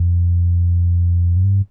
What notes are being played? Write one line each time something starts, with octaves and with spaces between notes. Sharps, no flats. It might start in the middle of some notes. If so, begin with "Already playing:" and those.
Already playing: F2
F#2
G2